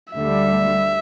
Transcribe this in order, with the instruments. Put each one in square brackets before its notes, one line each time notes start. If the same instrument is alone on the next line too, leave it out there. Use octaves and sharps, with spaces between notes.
[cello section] D2 D3 G3 [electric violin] E5